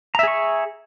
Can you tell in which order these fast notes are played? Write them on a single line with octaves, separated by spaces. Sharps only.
A#5 E5 G#4 C#6